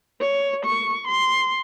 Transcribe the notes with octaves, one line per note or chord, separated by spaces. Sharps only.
C#5
C#6
C6